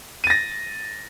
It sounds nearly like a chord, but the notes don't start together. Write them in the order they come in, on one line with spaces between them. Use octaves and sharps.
D#7 A6 A#6